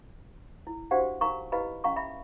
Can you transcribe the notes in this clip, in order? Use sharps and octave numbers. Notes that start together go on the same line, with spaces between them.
E4
D4 F#4 G4 C5 F5 F#5
D#4 A#4 F5 A#5 C#6
E4 G4 B4 D#5 F5 B5
C#4 D#5 F5 A#5 C#6
E5 B5